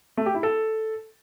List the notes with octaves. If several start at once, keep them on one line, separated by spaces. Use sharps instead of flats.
A3
G4
E4
A4